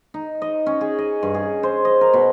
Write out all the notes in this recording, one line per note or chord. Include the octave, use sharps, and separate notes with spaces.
D#4
D#5
C#4
G#4
D#5
G2
G#4
C5
D#5
A#4
B2